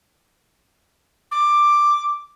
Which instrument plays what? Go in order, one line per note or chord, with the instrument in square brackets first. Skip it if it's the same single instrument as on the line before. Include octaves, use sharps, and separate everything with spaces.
[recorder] D6